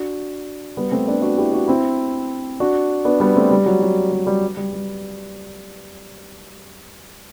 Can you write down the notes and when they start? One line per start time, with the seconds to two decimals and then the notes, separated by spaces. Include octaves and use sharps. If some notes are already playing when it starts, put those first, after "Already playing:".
Already playing: D4 F#4
0.77 G3 B3
0.92 A3 C4
1.08 B3 D4
1.22 D4 F#4
1.38 E4 G4
1.53 D4 F#4
1.68 C4 E4
2.60 D4 F#4
3.05 B3 D4
3.20 G3 B3
3.36 A3 C4
3.51 G3
3.66 F#3
3.82 F#3
4.12 G3
4.27 G3
4.57 G3
4.73 G3